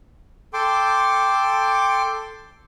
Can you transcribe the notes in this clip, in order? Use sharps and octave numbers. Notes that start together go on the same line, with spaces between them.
A4 G5 C6 D6